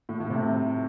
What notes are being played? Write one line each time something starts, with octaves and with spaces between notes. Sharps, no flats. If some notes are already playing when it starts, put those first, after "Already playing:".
A2
A2
C3